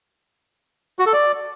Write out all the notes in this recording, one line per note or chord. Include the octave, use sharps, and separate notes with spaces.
F#4
A4
D5